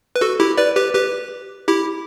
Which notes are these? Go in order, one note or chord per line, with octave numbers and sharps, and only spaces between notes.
B4
F#4 A4
E4 G4
B4 D5
G4 B4
G4 B4
E4 G4